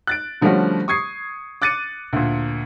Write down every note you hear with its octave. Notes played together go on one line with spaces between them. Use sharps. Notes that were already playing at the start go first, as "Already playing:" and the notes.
F#6 A6 D7
D3 F3 G3 A3 C#4 F#4
C#6 D#6 G#6 C7
D6 F#6 A6 C#7 D#7
D2 A#2